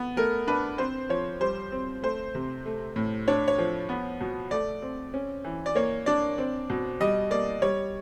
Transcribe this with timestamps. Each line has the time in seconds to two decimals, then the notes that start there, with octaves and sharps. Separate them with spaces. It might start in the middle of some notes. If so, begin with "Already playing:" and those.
Already playing: B3
0.17 A3 A#4
0.47 D4 B4
0.78 C4 C5
1.09 F3 C#5
1.40 G3 C5
1.72 C4
2.02 A3 C5
2.35 C3
2.66 A3
2.96 A2
3.28 D4 C#5
3.48 C#5
3.58 F3
3.89 B3
4.21 B2
4.51 A3 D5
4.82 C4
5.14 C#4
5.44 E3
5.66 D5
5.75 A#3 C#5
6.06 D4 D5
6.38 C4
6.70 B2
7.00 G3 D#5
7.31 A#3 D5
7.62 G3 C#5